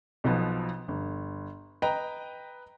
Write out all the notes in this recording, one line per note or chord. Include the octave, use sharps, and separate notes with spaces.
B1 B2 F3 B4
G1
B4 D#5 G5 A#5